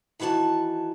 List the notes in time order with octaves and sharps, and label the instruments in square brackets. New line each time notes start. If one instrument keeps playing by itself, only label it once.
[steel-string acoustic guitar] D#3 E3 F#4 C#5 A5